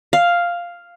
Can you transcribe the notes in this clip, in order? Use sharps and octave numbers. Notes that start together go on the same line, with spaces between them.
F5